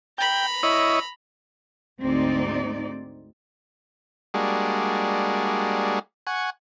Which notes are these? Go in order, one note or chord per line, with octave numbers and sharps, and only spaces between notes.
G5 A#5 B5
E4 C#5 D#5
D2 G#2 C4 D#4 D5
G3 G#3 A#3 D4 F#4 G#4
F#5 G#5 C#6